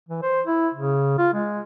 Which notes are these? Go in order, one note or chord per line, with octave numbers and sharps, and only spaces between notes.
E3
C5
E4
C#3
F4
G#3